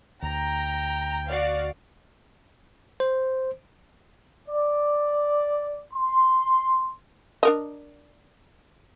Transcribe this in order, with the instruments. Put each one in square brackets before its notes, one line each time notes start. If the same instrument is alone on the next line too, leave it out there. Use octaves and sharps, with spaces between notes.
[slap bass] D2 [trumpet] G5 [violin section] A#5
[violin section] F#4 D5 F5
[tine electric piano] C5
[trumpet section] D5
C6
[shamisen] D4 A#4 D#5